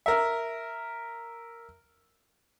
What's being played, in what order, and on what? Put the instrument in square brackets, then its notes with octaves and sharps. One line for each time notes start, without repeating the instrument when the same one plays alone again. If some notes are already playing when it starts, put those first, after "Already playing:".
[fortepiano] A#4 E5